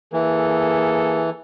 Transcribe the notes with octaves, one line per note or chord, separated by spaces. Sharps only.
E3 A#3 G#4 A4